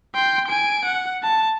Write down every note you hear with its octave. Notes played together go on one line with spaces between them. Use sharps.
G5 C6
G#5 D7
F#5
A5